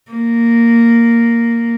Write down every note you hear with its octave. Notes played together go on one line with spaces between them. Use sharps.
A#3